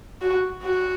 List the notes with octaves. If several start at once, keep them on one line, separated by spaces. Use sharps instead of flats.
F#4
F#4